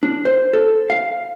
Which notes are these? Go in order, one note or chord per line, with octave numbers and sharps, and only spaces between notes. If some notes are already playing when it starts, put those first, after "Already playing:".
D4
C5
A4
F5